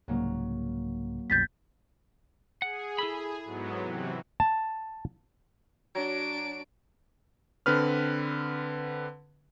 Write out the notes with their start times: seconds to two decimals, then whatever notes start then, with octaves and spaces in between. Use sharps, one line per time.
0.08 C2 G#2 C#3 F#3 A#3
1.30 C2 F#2 B2 G6 A6 B6
2.62 G#4 F#5
2.98 E4 A4 B5
3.44 G#2 F#3 B3
3.81 C3 E3 F#3
4.40 A5
5.95 F#3 D4 D7
7.66 D3 C4 B4 F6